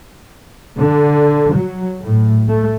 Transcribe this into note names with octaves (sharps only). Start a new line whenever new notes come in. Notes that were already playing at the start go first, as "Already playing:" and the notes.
D3
F#3
A2
A3